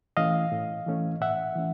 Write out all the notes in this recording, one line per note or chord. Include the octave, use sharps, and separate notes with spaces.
E3 A3 C#4 D#5 F5
A2
E3 A3 C#4
A2 E5 F#5
E3 A3 C#4